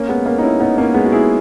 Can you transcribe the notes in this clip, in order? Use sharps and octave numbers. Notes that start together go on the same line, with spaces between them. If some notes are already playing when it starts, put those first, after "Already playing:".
Already playing: A#3 C#4
G#3 B3
A#3 C#4
D#4
C#4 E4
B3 D#4
A#3 C#4
G#3 B3
F#4
E4 G#4